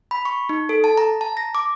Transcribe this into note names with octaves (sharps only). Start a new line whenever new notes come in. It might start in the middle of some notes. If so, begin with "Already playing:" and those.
B5
C#6
D#4
A4
A5
A#5
A5
A#6
D6